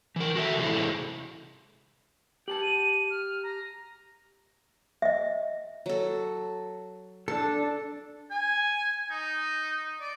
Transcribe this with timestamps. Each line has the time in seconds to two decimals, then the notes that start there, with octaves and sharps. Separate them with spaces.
0.16 E3 A#4
0.35 F#4 A4 E5
0.58 A2 C3 E3 G#3 E4 A4
2.48 G4 G#5 A5 F#7
2.62 D#7
3.10 F6
3.43 A#5
5.02 D#5 E5
5.86 F#3 A4
7.28 D4 A4 A5
8.31 G#5
9.11 D#4
10.01 D5